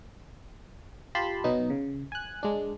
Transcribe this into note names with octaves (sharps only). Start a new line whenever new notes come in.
F4 G4 A5 B5 C6
B2 F#3 B3 D#4
C#3
G#5 F#6
G#3 D4